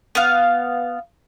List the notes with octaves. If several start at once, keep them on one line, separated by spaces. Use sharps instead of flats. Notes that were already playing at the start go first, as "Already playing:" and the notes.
B3 F5